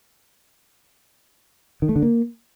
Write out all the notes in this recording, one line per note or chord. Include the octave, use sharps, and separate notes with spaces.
D#3
A3
D3
A#3